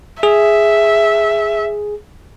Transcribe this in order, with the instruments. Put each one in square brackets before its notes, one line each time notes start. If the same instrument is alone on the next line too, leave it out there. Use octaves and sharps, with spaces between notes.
[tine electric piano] G#4 [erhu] E5